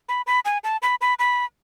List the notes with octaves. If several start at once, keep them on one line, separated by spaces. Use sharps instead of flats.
B5
B5
G#5
A5
B5
B5
B5